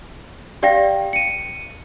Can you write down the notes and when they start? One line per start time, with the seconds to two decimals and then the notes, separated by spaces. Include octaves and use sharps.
0.63 G4 D5 F5 G5 A#6
1.13 C#7 D#7